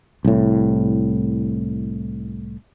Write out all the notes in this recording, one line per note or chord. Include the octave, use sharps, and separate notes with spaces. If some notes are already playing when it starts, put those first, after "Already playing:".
C2 A2